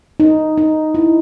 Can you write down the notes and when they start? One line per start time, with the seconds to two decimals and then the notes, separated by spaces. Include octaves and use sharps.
0.20 D#4
0.57 D#4
0.95 E4